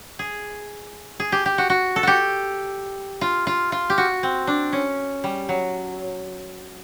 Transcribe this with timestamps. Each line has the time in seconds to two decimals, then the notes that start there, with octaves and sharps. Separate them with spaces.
0.19 G#4
1.20 G#4
1.32 G4
1.46 G4
1.58 F#4
1.70 F#4
1.96 A4
2.03 F#4 G4
3.21 F4
3.47 F4
3.72 F4
3.90 G4
3.98 F#4
4.23 C4
4.47 D4
4.73 C#4
5.24 G3
5.49 F#3